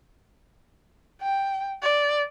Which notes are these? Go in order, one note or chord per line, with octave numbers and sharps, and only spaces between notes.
G5
D5